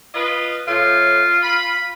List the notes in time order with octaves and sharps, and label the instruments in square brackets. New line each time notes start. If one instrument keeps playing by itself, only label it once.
[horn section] F4 B4 D#5
[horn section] A2 [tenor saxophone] F4
[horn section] B5